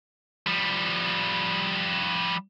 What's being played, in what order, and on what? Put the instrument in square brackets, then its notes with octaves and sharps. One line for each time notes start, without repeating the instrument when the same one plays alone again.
[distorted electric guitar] F3 G3